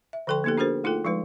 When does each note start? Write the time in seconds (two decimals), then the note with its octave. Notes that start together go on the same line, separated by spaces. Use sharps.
0.13 E5
0.27 D3 F3 A4 G5 C6
0.44 A#3 B3 D#4 G4 A4
0.58 D4 F#4 G#4 A#4 C5
0.84 A3 D#4 F4 A4 G5
1.05 F3 G#3 D#4 B4